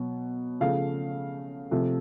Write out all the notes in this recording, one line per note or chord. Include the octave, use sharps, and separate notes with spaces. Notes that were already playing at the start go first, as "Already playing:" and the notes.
Already playing: B2 F#3 B3
C#3 F3 A3 F5
C3 F3 A3